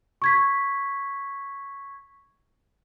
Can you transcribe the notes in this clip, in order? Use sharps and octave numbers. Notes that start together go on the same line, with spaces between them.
C#6 G#6 B6